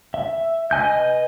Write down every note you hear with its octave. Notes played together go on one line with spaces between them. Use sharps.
E5
B4 D#5 G#5 G6